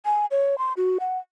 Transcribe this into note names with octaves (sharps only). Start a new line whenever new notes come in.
G#5
C#5
C6
F#4
F#5